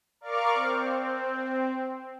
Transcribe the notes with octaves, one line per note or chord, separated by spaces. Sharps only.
A#4 D5 F5 C#6 D6 F6
C4